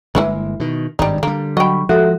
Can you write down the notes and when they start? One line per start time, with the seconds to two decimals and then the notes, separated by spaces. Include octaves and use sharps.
0.15 G1 E3 G#3 A#3 E4 B4
0.60 B2 D#3
0.99 G#1 G2 G3 D#4
1.23 D3 G3 A#3
1.57 F#3 D#5 G5 B5 C#6
1.89 F3 G#3 F#4 A4 E5 F#5